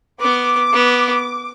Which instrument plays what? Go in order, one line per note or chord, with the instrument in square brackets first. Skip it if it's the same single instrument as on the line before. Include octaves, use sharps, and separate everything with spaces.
[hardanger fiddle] B3 [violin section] D6
[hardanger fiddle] B3